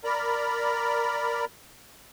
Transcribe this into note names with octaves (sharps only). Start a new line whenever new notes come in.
A#4 D5 A#5 B5